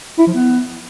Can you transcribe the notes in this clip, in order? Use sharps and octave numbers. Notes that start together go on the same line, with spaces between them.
E4
F3
B3